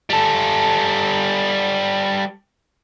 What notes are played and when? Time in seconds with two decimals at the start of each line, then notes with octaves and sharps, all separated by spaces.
0.10 G3 A4